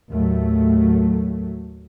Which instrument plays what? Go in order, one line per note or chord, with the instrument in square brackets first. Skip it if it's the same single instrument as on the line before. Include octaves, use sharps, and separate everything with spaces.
[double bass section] D#2 A2 F#3 A3